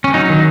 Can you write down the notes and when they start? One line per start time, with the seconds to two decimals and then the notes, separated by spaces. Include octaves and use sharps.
0.04 C#4
0.14 F#3 D#4
0.30 D#3